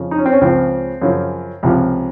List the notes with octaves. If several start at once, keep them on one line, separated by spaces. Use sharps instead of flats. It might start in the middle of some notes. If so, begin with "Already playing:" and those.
Already playing: F2 C#3 F3
D#4
C#4
C4
C#4
C#2 C#3 F3 C4
F#2 C#3 F3
C#2 C3 F3